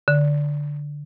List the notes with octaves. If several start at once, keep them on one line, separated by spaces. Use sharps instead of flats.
D3